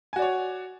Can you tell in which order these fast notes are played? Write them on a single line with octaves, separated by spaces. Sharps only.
G#5 F#4 D5 C#5